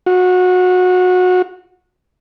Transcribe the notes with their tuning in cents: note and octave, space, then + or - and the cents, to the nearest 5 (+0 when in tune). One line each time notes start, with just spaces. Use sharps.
F#4 -25